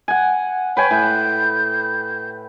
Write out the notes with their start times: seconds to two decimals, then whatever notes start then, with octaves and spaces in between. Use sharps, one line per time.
0.08 F#5 G#5
0.77 B4 C#5 G5 G#5
0.91 A2 G6